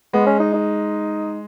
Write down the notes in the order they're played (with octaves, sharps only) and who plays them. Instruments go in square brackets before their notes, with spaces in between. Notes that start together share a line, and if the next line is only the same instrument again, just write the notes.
[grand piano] G#3 [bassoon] B3
[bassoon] C#4
D#4
D#4